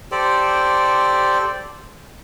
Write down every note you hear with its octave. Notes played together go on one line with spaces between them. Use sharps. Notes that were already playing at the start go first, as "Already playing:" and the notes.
G4 A4 C5 D5